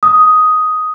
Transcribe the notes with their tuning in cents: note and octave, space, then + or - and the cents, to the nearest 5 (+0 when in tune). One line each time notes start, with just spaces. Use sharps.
D#6 +5